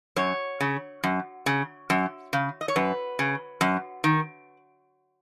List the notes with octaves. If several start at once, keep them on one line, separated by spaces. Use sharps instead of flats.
F#2 C#5
C#3
F#2
C#3
F#2
C#3
D#5
C#5
F#2 B4
C#3
F#2
D#3